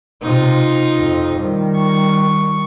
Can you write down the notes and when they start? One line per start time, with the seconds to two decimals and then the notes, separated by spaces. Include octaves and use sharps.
0.22 C3 D#4 F4
0.98 F2
1.39 D#3 G3
1.76 C#6